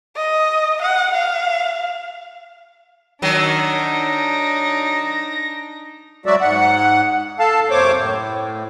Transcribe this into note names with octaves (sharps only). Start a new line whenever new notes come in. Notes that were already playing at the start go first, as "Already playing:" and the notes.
D#5
F#5
F5
D#3 F#3 D4 D#4 A#6
F#3 G#3 F#4 D5 E5
G#2 F#5
A4 F5 A5
F#2 C3 A#3 C5 C#5 D6
A2